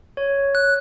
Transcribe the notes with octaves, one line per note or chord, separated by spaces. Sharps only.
C#5
F#6